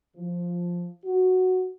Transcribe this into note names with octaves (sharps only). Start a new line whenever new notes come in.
F3
F#4